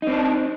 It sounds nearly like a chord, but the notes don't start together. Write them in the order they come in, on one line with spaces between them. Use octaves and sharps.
D#4 C4 D4